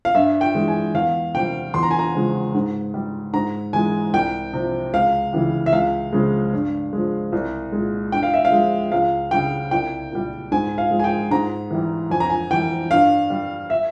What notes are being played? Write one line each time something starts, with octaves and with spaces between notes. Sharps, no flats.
F5
G2 E5
G5
E3 G#3
G#5
E2 F5
C3 G3 G5
E2 C6
A#5
G#5
A#5
C#3 F3 G#3
G#2
G3
G#2 A#5
E3 G#3 G#5
C2 G5
C3 F3
C#2 F5
C#3 E3 G3
E5
C#2 F5
C#3 F3 G#3
G2
F3 G#3
C2
A#2 G#3
G2 G5
F5
E5
F5
F3 G#3
C#2 F5
C#3 G3 G5
C2 G5
A#2 G3
G#2 G#5
F5
F3 G#3
G#5
G5
G#2 A#5
E3 G3
F2 G#5
A#5
G#5
E3 G3 G5
G2 F5
G3
E5